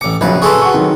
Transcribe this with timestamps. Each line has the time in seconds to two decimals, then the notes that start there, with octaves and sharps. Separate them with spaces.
0.01 A1 D6 C#7
0.21 A#1 C#3 F#3 B4
0.42 G#4 A4 B4 C6 C#6
0.62 F#4 F#5 C#6
0.74 D#3 F#3